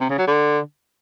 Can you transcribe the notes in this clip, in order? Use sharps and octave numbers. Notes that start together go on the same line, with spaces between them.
C3
C#3
F#3
D3